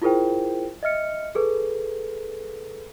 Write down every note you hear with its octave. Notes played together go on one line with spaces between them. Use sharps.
E4 F4 G#4 A#4 C5 G5
D#5 E5 F6 C#7
G#4 A4 B4